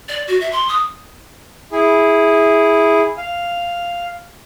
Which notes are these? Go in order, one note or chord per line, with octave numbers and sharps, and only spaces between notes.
D5
F#4
E5
C6
D#6
E4 G#4
F5